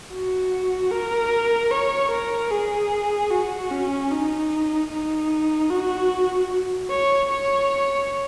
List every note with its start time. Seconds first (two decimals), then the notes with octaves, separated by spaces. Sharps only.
0.11 F#4
0.91 A#4
1.71 C#5
2.11 A#4
2.51 G#4
3.31 F#4
3.71 C#4
4.10 D#4
4.90 D#4
5.70 F#4
6.90 C#5
7.30 C#5